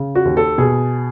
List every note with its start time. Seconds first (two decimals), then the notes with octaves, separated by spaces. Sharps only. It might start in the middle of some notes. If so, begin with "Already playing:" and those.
Already playing: C#3
0.15 F#4
0.25 D#2
0.37 A4
0.58 B2 G#4